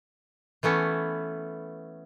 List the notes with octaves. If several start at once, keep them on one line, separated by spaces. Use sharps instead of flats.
E3 A3 B3 C#4